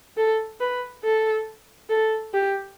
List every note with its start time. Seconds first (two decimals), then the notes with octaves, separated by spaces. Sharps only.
0.17 A4
0.60 B4
1.04 A4
1.90 A4
2.33 G4